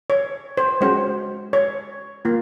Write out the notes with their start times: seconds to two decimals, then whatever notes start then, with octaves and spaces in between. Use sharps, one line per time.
0.10 C#5
0.57 C5
0.81 G#3 C#4 F#4 C5
1.53 C#5
2.25 A#3 F4